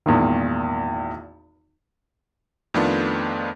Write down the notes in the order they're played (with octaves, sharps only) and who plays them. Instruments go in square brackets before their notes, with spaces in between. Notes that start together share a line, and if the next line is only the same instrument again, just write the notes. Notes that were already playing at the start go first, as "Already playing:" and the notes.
[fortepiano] G#1 E2 A#2 D#3
[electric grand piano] F2 D#3 A3 B3 D4 F4